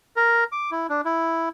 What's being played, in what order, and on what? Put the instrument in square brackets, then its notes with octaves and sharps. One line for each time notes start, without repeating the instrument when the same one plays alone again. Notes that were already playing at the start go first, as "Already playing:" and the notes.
[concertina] A#4
D6
E4
D4
E4